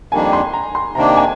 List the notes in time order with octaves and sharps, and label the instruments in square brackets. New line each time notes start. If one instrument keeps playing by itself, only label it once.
[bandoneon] F2 D#3 G3 A#3 D4 [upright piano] G#5
[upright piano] C6
A#5
C6
[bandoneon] C3 D#3 A#3 D4 [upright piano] A#5
[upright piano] G#5